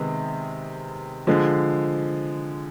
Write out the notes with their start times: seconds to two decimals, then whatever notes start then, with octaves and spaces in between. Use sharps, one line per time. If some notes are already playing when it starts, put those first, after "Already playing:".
Already playing: C3 D#3 G#3 B3
1.27 D3 F3 G#3